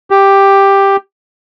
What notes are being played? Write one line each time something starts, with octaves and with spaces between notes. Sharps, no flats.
G4